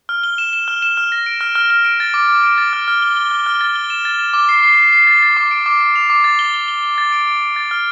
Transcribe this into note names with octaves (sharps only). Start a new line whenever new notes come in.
F6
G7
E7
E7
F6
E7
F6
A#6
D7
F6
F6
F6
D7
A6
D6
D6
D7
A6
F6
F6
G7
G7
F6
F6
A6
G7
E7
A6
E7
D6
C7
C7
C7
C7
A6
A6
D6
D7
D6
D6
F7
D6
A6
G7
G7
G7
G7
A6
D7
D7
D7
A6
F6